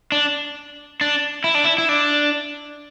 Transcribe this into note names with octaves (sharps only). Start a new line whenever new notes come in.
D4
D4
E4
D4
E4
E4
D4